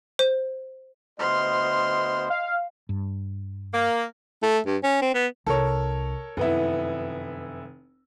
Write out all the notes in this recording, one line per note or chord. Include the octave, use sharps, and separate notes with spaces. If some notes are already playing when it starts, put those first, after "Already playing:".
C5
D2 B3 C5 D#5 C6 F6
F5
G2
A#3
A3
G2
C#4
C4
B3
C2 A4 A#4 C#5
F1 F#2 D#3 B3 E4